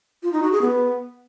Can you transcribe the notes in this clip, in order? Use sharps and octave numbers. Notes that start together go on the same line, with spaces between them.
F4
D#4
F#4
G#4
B3